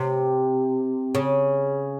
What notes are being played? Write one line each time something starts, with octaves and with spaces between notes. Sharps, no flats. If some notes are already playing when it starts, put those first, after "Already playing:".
Already playing: C3
C#3